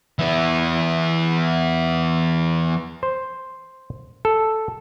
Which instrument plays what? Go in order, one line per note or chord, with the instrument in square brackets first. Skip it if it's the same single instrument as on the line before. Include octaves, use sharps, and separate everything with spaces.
[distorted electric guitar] E3 B3
[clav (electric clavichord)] C5
A4